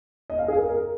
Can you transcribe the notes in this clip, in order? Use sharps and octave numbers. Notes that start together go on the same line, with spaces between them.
D#5
F5
G#4
A#4
A#4